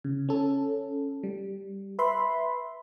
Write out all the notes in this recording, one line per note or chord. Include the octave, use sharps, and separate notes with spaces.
C#3
C#4 A4
G3
B4 E5 B5 C6